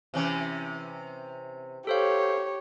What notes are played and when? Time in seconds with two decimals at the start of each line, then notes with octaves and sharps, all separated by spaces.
0.14 C3 E3 C#4
1.87 G4 A4 C5 C#5 F5